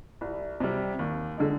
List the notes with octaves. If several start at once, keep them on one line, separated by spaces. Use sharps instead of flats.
C2
C3 G3
D#2
D3 G#3 D#4